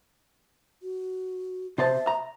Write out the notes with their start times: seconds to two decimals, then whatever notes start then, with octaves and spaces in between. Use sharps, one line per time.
0.82 F#4
1.78 C3 C5 E5 A5
2.07 A#5